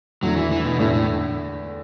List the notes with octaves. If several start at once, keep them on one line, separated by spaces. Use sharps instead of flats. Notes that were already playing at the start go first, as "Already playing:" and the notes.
E2 D3 F#3 A3 E4
E3
E3
B2
E2 A2 D3 A3 E4
A2